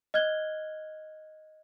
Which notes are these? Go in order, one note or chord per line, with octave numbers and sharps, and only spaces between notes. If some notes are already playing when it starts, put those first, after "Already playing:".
D#5 F6 F#6 G#6 G7